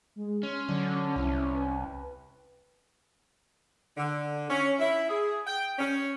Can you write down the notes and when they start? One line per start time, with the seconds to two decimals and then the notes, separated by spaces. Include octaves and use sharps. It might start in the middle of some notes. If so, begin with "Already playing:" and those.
0.16 G#3
0.43 C#4 C6
0.69 D3 F#3
1.16 C2 E4
1.54 B4
3.97 D3
4.50 C#4
4.79 E4
5.09 G#4
5.47 G5
5.79 C#4